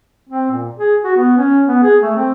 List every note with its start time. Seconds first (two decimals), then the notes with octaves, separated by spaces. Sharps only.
0.29 C4
0.51 A#2
0.77 G#4
1.04 F#4
1.16 B3
1.37 C#4
1.68 B3
1.83 G#4
2.02 A3
2.16 C4